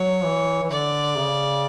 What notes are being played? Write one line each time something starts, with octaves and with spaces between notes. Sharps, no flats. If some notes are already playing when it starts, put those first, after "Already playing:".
Already playing: F#3 C#5
E3
E3
D3 D5
C#3